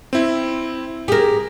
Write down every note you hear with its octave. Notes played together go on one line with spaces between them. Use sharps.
C4 E4
G4 G#4 A#4